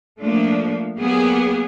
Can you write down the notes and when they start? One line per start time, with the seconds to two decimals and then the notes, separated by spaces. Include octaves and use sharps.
0.21 F3 A3 A#3 D4
0.97 F#3 A#3 B3 G4 G#4